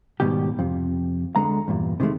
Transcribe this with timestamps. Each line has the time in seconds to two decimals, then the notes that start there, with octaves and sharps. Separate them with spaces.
0.20 G#2 B2 D#3 G3 G4
0.59 F2 C3
1.36 D2 D3 G#3 A#5
1.68 E2 G2 A#2
2.00 C3 D#3 F3 G#3 A3